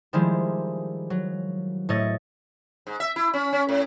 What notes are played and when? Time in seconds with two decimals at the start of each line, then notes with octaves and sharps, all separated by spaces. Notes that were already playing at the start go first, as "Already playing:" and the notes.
0.13 D#3 F3 G3 G#3 E4
1.10 F#3
1.89 A2 A3 C#5 D#5 A6
2.87 G#2
3.00 E5
3.16 E4
3.34 C#4
3.53 C#4
3.69 A2